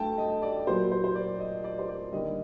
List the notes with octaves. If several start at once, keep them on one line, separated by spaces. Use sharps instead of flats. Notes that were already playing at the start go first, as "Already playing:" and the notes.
Already playing: G2 A3 G5 A5
D#5
D5
A#2 F#3 A#3 C5
C5
C5
D5
D#5
D5
C5
D5
D#2 D3 G3 D#5